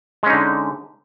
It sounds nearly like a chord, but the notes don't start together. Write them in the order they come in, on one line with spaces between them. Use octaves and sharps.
G#3 C#4 D#4 D3